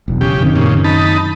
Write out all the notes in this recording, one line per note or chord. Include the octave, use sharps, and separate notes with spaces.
E1 B1 E2
C#3 G4
F#2 D#3 C4
A#2 C#3
D#4 A5 B5